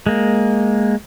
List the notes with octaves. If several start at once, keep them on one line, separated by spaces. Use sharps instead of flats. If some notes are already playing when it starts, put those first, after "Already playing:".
G#3 A#3